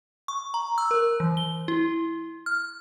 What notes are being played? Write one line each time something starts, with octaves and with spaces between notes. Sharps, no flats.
C#6
A#5
E6
A#4
E3
G7
E4
F6